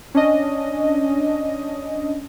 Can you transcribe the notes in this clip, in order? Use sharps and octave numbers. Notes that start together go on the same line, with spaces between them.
C#4 D4 D#5